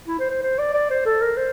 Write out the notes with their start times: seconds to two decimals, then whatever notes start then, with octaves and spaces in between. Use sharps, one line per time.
0.08 E4
0.20 C5
0.30 C5
0.43 C5
0.59 D5
0.74 D5
0.90 C5
1.06 A4
1.22 A#4
1.37 C5